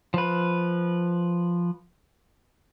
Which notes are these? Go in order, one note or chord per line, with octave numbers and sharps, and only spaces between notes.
F3 B4